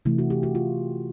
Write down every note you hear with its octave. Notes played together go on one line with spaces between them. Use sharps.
C3 E3 A3 E4
F#4
G4
F#4
F4